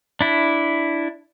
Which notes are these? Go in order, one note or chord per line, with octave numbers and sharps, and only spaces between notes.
D4 E4